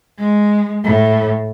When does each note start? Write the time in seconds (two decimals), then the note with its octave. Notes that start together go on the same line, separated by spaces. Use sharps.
0.19 G#3
0.84 A2